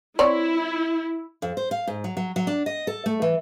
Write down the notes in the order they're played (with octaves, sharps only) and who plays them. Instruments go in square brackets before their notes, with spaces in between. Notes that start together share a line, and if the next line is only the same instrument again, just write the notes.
[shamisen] C4 C#5 D5 [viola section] E4
[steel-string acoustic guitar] F2
C5
F5
G#2
F#3
F#3
F#3
D4
D#5
A4
A3
E3